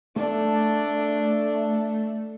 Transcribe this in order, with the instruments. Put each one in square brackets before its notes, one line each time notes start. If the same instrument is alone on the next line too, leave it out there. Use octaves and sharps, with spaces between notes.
[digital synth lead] A3 [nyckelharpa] D4 A4